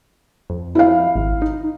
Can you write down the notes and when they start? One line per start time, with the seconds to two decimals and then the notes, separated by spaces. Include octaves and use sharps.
0.50 F2
0.75 E4 F5
1.15 G#1
1.42 D#4